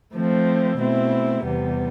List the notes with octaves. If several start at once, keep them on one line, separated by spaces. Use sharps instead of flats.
F3 A3 C4
B2 A3 C4 E4
E2 C3 G3 B3